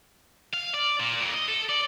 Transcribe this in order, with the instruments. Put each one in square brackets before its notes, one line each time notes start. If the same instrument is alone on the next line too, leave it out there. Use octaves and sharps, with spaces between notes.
[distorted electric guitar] F5
D5
A#2
F2
D#5
A4
D5